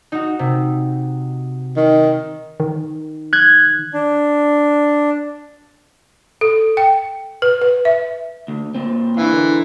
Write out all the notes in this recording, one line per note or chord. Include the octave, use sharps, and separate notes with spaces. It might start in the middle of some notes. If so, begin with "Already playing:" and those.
D#4 F#4
C3
D#3
D#3
F#6 G#6
D4
A4
G5
B4
B4
E5
D2
A#2 C4
E3 D4 F5
D3 A#4